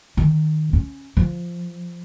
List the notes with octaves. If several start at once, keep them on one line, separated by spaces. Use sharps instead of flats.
D#3
C#4
F3